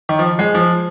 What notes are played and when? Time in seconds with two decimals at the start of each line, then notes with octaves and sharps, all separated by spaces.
0.09 D#3
0.19 F3
0.39 G#3
0.55 F3